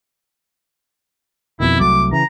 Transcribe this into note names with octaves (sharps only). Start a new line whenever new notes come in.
F2 B2 D#3 E4
C2 F#3 A3 D6
C#3 E3 A#5